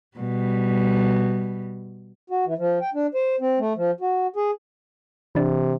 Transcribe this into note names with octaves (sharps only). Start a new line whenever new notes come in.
B2 G3
F#4
E3
F3
G5
D4
C5
C4
A3
F3
F#4
G#4
C3 E3 D4